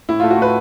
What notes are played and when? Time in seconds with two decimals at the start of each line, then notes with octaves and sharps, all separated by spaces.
0.09 A2 E4
0.20 A3 F4
0.31 F#4
0.39 A2 B4